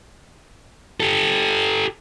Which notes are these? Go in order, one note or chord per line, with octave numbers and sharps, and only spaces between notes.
G4 A4